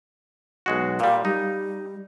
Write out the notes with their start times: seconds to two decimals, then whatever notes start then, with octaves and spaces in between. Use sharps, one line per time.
0.66 B1 G#3 F#4
1.00 A#2 G3 F5
1.25 G3 D#4